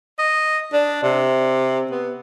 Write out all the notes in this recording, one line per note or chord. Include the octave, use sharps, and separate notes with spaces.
D#5
D4
C3
B3